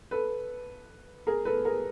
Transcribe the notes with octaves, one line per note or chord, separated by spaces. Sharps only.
A4 B4
G#4 A#4
A4 B4
G#4 A#4